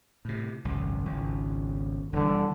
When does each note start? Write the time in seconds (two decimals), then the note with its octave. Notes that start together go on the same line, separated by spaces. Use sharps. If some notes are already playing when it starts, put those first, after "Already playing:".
0.25 A2 C3
0.64 G#1 C#2 F#2
1.05 G#1 C#2
2.13 E1 D3 E3 G3